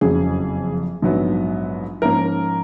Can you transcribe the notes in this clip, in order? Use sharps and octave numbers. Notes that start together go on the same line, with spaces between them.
F#1 F2 C#3 F#3 G#4
A#1 G#2 F#3 B3
G#2 F3 A#3 C#4 A#4